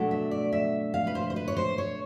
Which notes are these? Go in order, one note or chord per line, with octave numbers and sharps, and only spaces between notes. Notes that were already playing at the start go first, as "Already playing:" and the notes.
Already playing: B2 F#3 A3 D4
E5
D5
E5
F5
B4
C5
C5
B4
C#5
C5
C#5